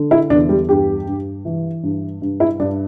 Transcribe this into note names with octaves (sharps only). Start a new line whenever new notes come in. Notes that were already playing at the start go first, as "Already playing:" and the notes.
Already playing: D3
E4
E2 D4
G3
G2 G4
G2
E3
G2
G2
E4
G2 D4